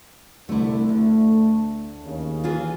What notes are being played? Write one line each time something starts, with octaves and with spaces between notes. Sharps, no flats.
C2 D3 A3 E4
D2 A3
D#2 C#3
E3 F4 G#4